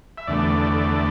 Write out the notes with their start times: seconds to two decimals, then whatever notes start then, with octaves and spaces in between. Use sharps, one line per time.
0.18 E5
0.27 E2 D3 A3 D5